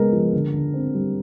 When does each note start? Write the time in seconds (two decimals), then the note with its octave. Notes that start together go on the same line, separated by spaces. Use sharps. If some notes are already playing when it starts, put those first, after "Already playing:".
Already playing: C#3 G#3 B3 A#4
0.12 F3
0.33 D3
0.54 D3
0.74 C4
0.94 G3